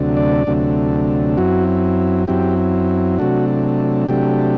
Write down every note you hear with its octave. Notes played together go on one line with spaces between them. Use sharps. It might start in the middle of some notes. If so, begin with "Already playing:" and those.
Already playing: D2 C3 F#3 A3 D4
D5
D2 C3 F#3 A3 D4
F#2 F#3 C4 E4 F#4
F#2 F#3 C4 E4 G4
C3 F#3 A3 D4 F#4
C3 F#3 A3 D4 G4